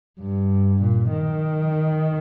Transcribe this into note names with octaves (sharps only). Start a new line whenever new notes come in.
G2
A#2
D#3